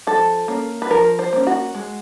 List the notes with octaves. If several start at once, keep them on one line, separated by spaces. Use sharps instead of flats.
F3 A4
A#3 C#4
B4
F3 A#4
C5
A#3 C#4
F#4
G#3